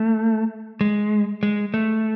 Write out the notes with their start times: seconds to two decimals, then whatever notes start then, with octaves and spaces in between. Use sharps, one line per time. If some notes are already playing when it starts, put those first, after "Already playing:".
Already playing: A3
0.81 G#3
1.43 G#3
1.74 A3